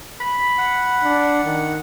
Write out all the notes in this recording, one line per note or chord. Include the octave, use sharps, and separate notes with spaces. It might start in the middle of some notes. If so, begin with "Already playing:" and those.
B5
F#5
D4
D#3